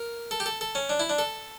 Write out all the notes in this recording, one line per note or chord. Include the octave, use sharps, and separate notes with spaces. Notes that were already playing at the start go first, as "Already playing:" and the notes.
Already playing: A#4
A4
G4
A4
A4
C#4
D4
E4
D4
A4